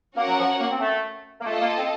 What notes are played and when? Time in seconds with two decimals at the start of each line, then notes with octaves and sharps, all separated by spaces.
0.16 A#3 C#4 F#4 A#4 C#5 F#5
0.27 F#3
0.39 F3
0.59 A#3
0.71 C4
0.80 A3
1.41 A#3
1.45 A3 F4 A4 D#5
1.60 A#3
1.77 C4